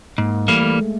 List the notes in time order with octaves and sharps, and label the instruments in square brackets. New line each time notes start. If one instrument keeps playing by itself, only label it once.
[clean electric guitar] G#2 [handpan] A#3
[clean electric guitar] E3 G3 A#3 [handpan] A3
[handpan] A3
G#3